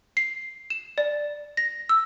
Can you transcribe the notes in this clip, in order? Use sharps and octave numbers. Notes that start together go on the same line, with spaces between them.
C7
E7
D5
A#6
E6